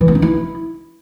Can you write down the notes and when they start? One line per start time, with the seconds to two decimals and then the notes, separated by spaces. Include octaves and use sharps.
0.01 E3
0.08 B3
0.15 C#4
0.22 E4